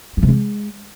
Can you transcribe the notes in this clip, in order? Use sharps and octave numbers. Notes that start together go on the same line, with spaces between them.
F3
C3
G#3